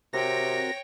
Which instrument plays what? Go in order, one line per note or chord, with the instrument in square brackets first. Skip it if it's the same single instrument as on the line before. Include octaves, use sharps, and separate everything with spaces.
[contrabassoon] C3 [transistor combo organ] C4 F#4 A#4 [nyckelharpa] C#5 G5 [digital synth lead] A#6